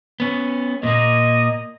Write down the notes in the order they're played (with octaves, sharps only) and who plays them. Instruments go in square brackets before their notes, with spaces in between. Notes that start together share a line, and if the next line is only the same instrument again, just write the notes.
[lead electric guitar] B3 C#4
[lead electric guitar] A#2 A#3 [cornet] D#5